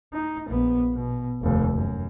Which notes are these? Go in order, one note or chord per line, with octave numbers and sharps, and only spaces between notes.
D#4
A#1 B3
B2
F1 D#2
F#2